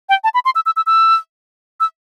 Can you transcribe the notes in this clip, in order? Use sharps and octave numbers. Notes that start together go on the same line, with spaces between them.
G5
A5
B5
C6
E6
E6
E6
E6
E6